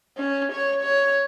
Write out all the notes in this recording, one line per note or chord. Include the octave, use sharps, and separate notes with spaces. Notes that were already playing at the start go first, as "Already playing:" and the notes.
C#4
C#5
C#5